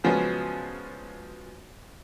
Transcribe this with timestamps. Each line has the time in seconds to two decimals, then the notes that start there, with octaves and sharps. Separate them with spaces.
0.04 C#3 F3 F#3 G#3 B3 C#4